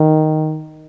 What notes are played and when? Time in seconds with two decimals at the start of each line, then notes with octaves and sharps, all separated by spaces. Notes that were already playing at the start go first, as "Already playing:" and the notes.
Already playing: D#3